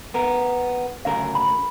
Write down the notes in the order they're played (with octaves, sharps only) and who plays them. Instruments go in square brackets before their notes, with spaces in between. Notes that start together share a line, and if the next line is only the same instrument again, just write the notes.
[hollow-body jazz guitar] B3 A#4
[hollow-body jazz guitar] D2 C#3 A#4 [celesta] F5
[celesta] B5